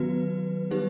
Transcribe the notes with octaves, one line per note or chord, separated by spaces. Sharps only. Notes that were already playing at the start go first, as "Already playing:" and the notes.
Already playing: D#3 F#3 B3 F#4 B4
G3 D#4 G4 B4